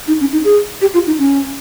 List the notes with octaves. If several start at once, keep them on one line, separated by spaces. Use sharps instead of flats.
D#4
C#4
D#4
G#4
G4
F4
D#4
C#4